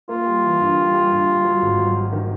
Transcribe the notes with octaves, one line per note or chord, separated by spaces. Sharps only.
A#3 F4
G3
E3
G2
G3
G3
G2
G3
F#3
G#1
F#3
F#3
D#3